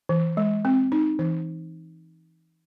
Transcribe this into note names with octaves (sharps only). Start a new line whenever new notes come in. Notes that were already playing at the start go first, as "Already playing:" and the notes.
E3
G#3
C4
D#4
E3